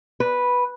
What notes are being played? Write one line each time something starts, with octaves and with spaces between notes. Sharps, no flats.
B4